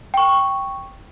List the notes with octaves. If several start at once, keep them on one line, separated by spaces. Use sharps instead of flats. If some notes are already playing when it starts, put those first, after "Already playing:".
G5 C#6